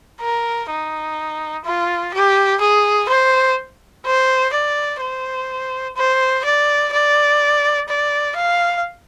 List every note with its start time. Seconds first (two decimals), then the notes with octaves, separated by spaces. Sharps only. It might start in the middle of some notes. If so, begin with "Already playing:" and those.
0.21 A#4
0.70 D#4
1.66 F4
2.14 G4
2.61 G#4
3.09 C5
4.06 C5
4.53 D5
5.01 C5
5.96 C5
6.45 D5
6.93 D5
7.88 D5
8.36 F5